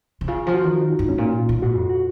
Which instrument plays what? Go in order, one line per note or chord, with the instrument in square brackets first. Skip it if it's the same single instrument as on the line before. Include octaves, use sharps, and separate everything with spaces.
[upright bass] C3
[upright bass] C#3 [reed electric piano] F4
[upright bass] F3
[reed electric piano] F#4
[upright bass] D#3
[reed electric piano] D#4
[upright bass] G#2
[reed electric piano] C#4
[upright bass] A#2
[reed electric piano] F4
[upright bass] A#2
[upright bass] G#2 [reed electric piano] F#4
[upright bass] F2
[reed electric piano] F#4